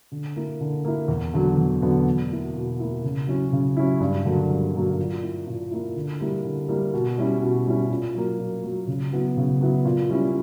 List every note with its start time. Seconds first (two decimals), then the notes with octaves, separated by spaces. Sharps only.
0.12 D3
0.36 A#3 E4
0.61 D3
0.85 A#3 E4
1.08 E2
1.34 D3 F#3 B3
1.57 E2
1.82 D3 F#3 B3
2.06 B2
2.30 A#3 E4
2.55 B2
2.80 A#3 E4
3.04 C#3
3.27 F#3 C#4 E4
3.52 C#3
3.77 F#3 C#4 E4
4.00 G2
4.25 D3 F#3 A#3
4.50 G2
4.74 D3 F#3 A#3
4.98 A#2
5.22 A#3 E4
5.47 A#2
5.71 A#3 E4
5.96 D3
6.21 G3 A#3 E4
6.45 D3
6.68 G3 A#3 E4
6.93 B2
7.18 G3 C#4 E4
7.42 B2
7.67 G3 C#4 E4
7.90 A#2
8.15 F#3 A#3
8.38 A#2
8.63 F#3 A#3
8.87 C#3
9.12 F#3 B3 E4
9.37 C#3
9.60 F#3 B3 E4
9.85 A#2
10.09 G3 C#4 E4